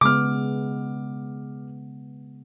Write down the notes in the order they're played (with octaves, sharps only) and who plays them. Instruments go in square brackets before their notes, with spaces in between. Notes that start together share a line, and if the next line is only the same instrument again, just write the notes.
[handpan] C#3 G#3 B3 [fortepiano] D6 F6